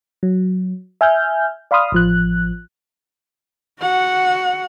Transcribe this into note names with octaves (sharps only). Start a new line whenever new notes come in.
F#3
E5 G#5 F6 G6
D5 F5 B5 C6 D#6 F6
A1 F3 F#6
F#4 F#5